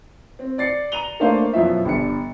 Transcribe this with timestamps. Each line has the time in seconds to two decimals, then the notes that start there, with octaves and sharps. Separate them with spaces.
0.39 C4
0.58 D5 A6 C7 C#7
0.92 A#5 D#7 F7 G7
1.20 A3 A#3 D4 A#4 C5 F5
1.53 F#2 B2 F3 E4 E5
1.85 G1 D4 C#7